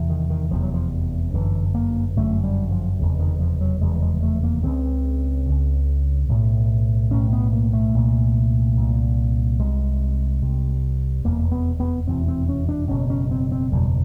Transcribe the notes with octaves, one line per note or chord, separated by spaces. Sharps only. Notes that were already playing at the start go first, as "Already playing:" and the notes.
Already playing: F1 E2 C3
D#3
D#3
F1 E2 C3 F3
F#3
F3
G1 F#2 D3 E3
A#3
G1 F#2 D3 A3
G3
F3
F1 E2 C#3
D#3
F3
F#3
F1 E2 C#3 G#3
G#3
A3
A#3
C#2 C#3 C4
C#2 C#3
B1 A2
B1 A2 C#4
B3
A#3
A3
C2 A#2
C2 A#2
C2 C3 G#3
C2 C3
F1 E2 B2 A#3
B3
B3
F1 E2 B2 C4
C4
C#4
D4
F#1 E2 B2 C#4
C#4
C4
C4
F#1 E2 B2 G3